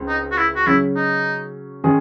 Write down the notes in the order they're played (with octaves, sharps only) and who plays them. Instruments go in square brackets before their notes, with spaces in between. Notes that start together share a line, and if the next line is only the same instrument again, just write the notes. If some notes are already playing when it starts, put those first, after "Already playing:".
Already playing: [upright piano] C#2 C#3 C4
[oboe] D#4
F#4
E4
F#4
[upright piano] C#3 F#3 C#4 [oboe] E4
[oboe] D#4
[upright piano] D#3 G#3 C#4 G#4